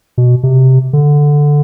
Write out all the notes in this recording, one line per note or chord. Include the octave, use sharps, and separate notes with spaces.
B2
C3
D3